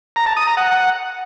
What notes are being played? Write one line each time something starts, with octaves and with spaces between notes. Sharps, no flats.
A#5
A5
D#6
A#5
F#5